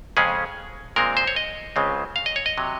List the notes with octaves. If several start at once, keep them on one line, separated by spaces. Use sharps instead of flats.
F2 C#3 G#3 C#4 G#4
A#2 G#3 C4 A#4
C5
C#5
D#5
C#2 C#3 G#3 C4
F5
D#5
C#5
D#5
C3 F#3